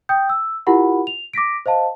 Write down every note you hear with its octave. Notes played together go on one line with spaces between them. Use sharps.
G5 D#6 G6
E6
E4 F4 G4 A#4 F#5 B5
F7
D6 A#6 B6 D7
C5 D#5 F5 A5